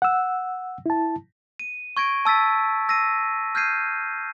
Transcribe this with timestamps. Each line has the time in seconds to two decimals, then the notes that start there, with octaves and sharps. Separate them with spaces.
0.02 F#5 E6
0.86 E4 A5
1.60 D#7
1.97 C#6 G#6 A#6 D7
2.25 A5 E6 A6 B6
2.89 E6 A#6 C7 D#7
3.55 F6 G6 G#6 C7 D#7